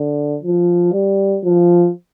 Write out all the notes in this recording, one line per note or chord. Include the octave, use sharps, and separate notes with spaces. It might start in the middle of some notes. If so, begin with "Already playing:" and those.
Already playing: D3
F3
G3
F3